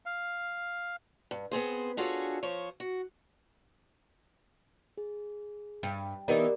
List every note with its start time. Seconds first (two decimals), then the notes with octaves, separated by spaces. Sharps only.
0.06 F5
1.31 G2
1.52 B3 C4 G#4 C5
1.97 D4 F4 F#4 G#4 A4 C#5
2.43 F3 C5 C#5
2.80 F#4
4.97 G#4
5.83 G2
6.28 E3 B3 D#4 G4 A#4 D5